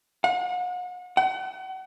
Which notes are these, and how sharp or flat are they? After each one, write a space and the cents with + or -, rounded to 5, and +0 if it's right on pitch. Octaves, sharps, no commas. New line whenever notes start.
F#5 -40
F#5 +35